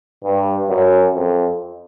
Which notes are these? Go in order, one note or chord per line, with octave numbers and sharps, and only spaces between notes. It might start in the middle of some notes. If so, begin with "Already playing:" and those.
G2
F#2
F2